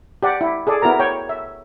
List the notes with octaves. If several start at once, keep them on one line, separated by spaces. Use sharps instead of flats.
G4 D5 F#5
E4
G#4 A4 D5
B3 E4 F#4 A#4 A#5
C#5 G5
E5